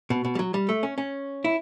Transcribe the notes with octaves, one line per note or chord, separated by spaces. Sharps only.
B2
B2
G3
F#3
G3
A3
C#4
C#4
E4